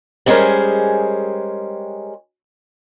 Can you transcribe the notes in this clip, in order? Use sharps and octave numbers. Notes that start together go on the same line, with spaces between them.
G3 G#3 C#4 G#4 A#4 C5